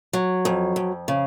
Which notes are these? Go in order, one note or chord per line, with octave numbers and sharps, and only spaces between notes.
F#3
F2
F2
C#3